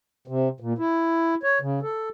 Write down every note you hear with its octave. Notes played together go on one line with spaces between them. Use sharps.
C3
A#2
E4
C#5
C#3
A4